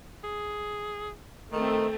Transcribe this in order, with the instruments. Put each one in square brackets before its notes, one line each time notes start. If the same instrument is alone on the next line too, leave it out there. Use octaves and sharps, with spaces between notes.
[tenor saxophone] G#4
[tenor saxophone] D#3 [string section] A3 C4